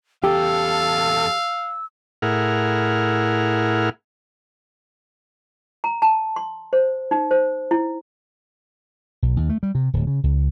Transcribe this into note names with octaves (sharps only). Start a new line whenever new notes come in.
E2 G4 A4 F5 E6
A2 E4 G#4 A#4 F#5 F6
A#5
A5
C6
C5
D#4
C5
E4
B1
D#2
A3
G3
C3
D1
C#3
C#2